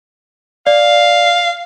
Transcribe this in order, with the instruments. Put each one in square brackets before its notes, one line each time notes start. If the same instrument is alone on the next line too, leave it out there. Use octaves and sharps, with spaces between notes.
[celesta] D5 [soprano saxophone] F5